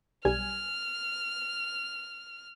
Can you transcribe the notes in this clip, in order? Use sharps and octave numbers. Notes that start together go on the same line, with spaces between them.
B1 G3 G#5 F6